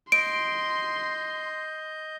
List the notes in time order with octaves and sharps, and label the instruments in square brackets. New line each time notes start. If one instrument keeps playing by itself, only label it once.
[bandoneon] D#5 G6 [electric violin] C6 [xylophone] D7